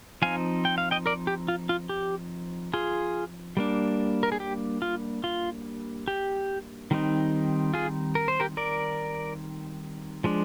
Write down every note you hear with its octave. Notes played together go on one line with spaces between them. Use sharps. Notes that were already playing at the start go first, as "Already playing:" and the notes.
F3 C4 D#4 F5 G#5
G5
F5
D#5 G5
A#4 D5
G4
F4
F4
G4
F4 G#4
G3 A#3 D4
A#4
G#4
G4
F4
F4
G4
D#3 G3 C4 D#4
F4 G#4
A#4
C5
G4 A#4
A#4 D5
F3 G#3 D4